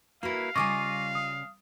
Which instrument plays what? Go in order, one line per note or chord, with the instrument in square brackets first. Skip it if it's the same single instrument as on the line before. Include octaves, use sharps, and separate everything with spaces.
[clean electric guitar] A#3 E4 [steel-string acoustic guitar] F#4 B4 [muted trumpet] F5
[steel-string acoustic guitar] C#3 G3 G#5 [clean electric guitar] F4 D#5 [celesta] C#6 D6
[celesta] D#6